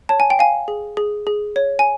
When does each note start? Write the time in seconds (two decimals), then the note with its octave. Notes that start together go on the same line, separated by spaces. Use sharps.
0.09 C#5 A5
0.20 G#5
0.30 G5
0.39 F5 G#5
0.68 G#4
0.97 G#4
1.27 G#4
1.56 C#5
1.79 G#5